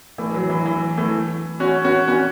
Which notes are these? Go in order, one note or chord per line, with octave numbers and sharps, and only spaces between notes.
E3 A3
E3
F#3
E3
E3
E3 A3
C#4 F#4
C#4 F#4
C#4 F#4